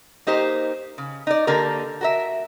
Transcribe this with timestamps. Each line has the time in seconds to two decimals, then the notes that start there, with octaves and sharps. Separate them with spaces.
0.27 A#3 D#4 G4 C5
0.98 C#3
1.27 D#4 D5
1.47 D3 A#3 G4 A#4
2.01 F#4 A#4 E5